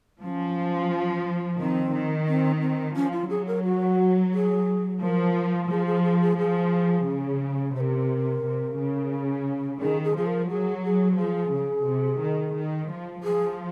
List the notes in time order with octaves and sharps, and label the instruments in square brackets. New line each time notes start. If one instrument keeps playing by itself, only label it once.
[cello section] F3 [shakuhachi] C#4
[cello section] D#3 [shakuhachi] C4
[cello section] D#3
[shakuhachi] C4
C4
[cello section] F3 [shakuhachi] C#4
[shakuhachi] F4
[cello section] F#3 [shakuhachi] G#4
[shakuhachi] A#4
F#4
G#4
[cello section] F3 [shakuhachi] A#4
[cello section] F3 [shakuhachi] G#4
[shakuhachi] G#4
G#4
G#4
[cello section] F3 [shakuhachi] G#4
[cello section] C#3
[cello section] C3 [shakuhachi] A#4 C5
[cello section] C3
C#3
[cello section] D#3 [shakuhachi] G#4
[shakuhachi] G#4
[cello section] F3 [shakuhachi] G#4
[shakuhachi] A#4
[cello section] F#3 [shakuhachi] G#4
[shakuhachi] G#4
[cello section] F3 [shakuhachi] G#4
[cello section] C#3
C3
D#3
D#3
F3
[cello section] F3 [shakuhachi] G#4